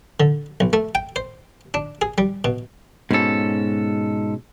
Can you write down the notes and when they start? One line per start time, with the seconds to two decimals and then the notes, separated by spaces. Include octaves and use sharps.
0.20 D3
0.60 B1
0.73 A3
0.95 G5
1.16 C5
1.74 D4
2.01 G#4
2.18 G3
2.44 B2
3.11 G#2 B2 C#4 A4